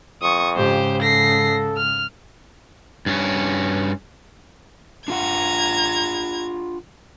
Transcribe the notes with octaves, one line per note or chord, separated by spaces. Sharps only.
F2 C#6 D#6
G#2 C#3 G4 C5
A4 A#6 C7
F6
G2 C#4
D4 F4 F#5 A#5 G#6